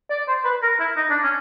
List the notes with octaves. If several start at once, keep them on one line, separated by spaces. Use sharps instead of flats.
D5
C5
B4
A#4
E4
D#4
D4
C#4